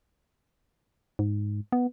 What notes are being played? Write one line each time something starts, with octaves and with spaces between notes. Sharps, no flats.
G#2
B3